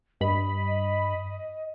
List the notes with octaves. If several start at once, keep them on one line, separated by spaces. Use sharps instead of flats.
G2 D#5 B5